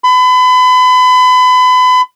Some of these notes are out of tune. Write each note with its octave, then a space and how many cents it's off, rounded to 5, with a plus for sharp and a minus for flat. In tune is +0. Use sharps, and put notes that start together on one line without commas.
B5 +35